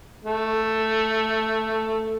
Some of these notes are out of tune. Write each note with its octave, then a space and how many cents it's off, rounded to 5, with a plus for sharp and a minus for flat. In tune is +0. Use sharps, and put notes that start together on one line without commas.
A3 +5